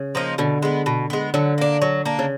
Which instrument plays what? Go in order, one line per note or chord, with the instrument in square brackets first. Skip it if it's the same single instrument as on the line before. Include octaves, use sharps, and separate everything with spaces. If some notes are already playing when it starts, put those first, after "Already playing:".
Already playing: [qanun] C#3
[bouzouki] F3 A#3 D#4
[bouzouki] B2 [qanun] D3
[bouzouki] G#3 B3
B2
G#3 B3
[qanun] D3 [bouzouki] F#3
[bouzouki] A#3 D4
F#3
A#3 D4
[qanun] C#3